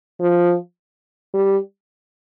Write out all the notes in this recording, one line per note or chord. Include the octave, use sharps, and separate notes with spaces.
F3
G3